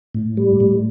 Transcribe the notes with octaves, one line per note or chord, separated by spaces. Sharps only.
A2
G3
A2